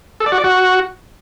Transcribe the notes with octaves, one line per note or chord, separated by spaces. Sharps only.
A4
D5
F#4
D5
F#4